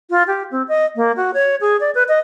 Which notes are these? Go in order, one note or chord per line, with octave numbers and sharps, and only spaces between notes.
F4
G4
C4
D#5
A#3
F#4
C#5
G#4
D5
B4
D#5